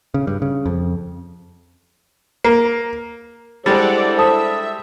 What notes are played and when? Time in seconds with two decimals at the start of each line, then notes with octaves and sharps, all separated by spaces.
0.14 C#3
0.27 G2
0.42 C#3
0.66 F2
2.45 A#3
3.66 G3 G#3 D4 E4 A4 C5 D5 F#5
4.18 A4 E5 A5 D#6